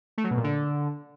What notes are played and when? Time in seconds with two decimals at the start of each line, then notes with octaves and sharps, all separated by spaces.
0.18 A3
0.24 F#3
0.31 B2
0.37 A#2
0.44 D3